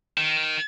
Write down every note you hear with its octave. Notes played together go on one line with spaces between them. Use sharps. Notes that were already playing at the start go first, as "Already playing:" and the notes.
D#3